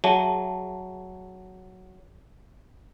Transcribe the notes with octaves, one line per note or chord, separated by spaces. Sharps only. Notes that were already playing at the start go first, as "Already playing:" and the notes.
F#3 G#4 E5 A5